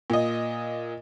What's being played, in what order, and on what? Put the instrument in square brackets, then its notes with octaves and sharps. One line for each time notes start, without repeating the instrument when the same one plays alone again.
[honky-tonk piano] A#2 D#5